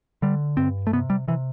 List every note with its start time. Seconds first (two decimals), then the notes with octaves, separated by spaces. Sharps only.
0.22 D3 G3
0.57 G2 C4
0.87 A3
0.93 C3 B3
1.10 G3
1.28 C3 E3